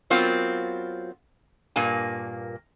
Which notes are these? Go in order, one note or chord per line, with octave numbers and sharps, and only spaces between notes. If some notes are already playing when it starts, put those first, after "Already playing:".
F#3 B3 C4 F4 A#4 F5
G2 A#2 A#3 G#5